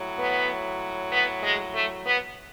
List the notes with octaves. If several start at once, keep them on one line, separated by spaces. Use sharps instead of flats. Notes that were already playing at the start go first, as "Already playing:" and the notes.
Already playing: A2 F#3
B3
B3
G#3
A3
B3